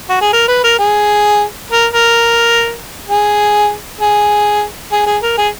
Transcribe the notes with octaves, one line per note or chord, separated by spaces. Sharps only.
F#4
G#4
A#4
B4
A#4
G#4
A#4
A#4
G#4
G#4
G#4
G#4
A#4
G#4